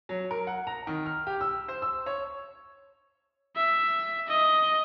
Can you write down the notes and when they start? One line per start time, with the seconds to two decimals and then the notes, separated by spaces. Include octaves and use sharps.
0.09 F#3
0.31 A#4
0.47 F#5
0.67 A#5
0.87 D#3
1.06 F6
1.27 G4
1.41 E6
1.68 C5
1.82 E6
2.06 C#5
3.56 E5
4.28 D#5